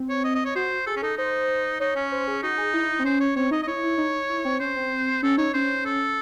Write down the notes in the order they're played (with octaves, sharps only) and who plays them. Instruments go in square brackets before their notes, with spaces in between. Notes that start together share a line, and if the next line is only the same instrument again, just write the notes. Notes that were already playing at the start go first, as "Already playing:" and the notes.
Already playing: [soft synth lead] C4
[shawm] C#5
D#5
D#5
C#5
[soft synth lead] F#4 [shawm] C5
[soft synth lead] G#4 [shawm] A4
[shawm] C#4
[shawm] D#4 [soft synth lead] A4
[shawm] D#4 [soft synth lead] C5
[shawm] D#4 [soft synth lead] C#5
[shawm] C#4
[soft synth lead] C5
G#4
[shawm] D#4 [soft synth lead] F#4
[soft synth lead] G#4
E4
C4
[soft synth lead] C#4 [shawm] C5
[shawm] C#5
[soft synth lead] C4 [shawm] C#5
[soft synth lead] D#4 [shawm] D#5
[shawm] D#5
[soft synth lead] E4 [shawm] C#5
[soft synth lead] E4
D#4
E4
C4
[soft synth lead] C#4 [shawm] C5
[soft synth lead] C4
[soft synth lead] C#4 [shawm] A4
[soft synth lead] D#4 [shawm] C#5
[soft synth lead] C#4 [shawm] C5
[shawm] A4